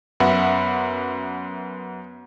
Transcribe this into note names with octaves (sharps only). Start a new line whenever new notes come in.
F#2 B3 E5 F#5 B5